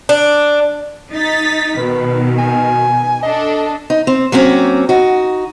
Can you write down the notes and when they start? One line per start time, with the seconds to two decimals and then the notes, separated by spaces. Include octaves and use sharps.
0.09 D4
1.11 D#4 A6 B6
1.78 B2 D#3 B4
2.39 G#5
3.23 D4 A4 D#5
3.90 D#4
4.07 C4
4.32 F#3 A#3 C4 C#4
4.89 D#4 F#4